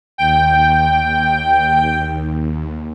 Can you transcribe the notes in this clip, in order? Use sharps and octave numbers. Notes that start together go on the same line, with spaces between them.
D#2 G5